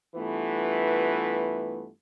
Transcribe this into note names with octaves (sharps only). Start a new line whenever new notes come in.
G2 E3 A3 B3 F4 B4